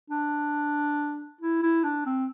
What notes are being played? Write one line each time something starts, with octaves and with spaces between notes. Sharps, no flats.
D4
E4
E4
D4
C4